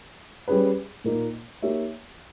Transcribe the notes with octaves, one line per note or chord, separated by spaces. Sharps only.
G3 C#4 G#4 B4
A#2 A#3 D#4
A#3 D#4 G4 C#5 E5